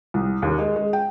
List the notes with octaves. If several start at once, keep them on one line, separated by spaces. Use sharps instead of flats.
C2
D#2
G#3
G#3
G5